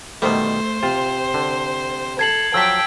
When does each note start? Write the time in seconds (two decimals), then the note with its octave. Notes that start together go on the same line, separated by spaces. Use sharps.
0.22 B2 D#3 G3 A3 C5
0.83 C3 F4
1.34 D3
2.19 A4 G#6 C7 F#7
2.54 F3 F#3 G5 A5 E6 B6